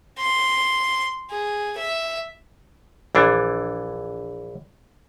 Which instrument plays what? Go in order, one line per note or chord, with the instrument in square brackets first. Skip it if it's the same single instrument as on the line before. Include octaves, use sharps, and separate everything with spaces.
[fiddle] C6
G#4
E5
[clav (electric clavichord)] A#1 E3 D4